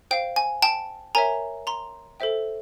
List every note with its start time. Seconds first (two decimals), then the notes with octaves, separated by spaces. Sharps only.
0.11 C5 F5 G5
0.36 G#5
0.62 G5 A5
1.15 A#4 C#5 E5 G#5 A#5
1.67 A#5 C6
2.20 A4 C5 E5 G5